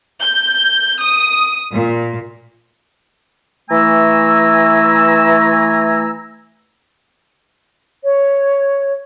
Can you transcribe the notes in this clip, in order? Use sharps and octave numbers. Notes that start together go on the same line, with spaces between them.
G6
D#6
A#2
E3 A3 B4 G#5 A#5 E6
C#5